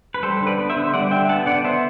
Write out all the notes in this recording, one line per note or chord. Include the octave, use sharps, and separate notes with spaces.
B4
G3 A4 C5
D3
B4 D5
B3
C5 E5
D3
G3 D5 F#5
D3 E5 G5
B3 F#5 A5
D3 D5 F#5
B3 C5 E5